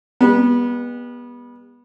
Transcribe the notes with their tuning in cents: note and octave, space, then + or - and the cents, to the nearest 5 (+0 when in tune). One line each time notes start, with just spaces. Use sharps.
G3 +40 B3 -25